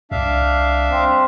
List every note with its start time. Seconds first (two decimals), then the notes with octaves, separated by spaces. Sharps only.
0.11 C2 D4 E5 F5
0.91 C4